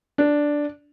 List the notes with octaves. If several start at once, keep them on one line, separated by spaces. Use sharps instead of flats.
D4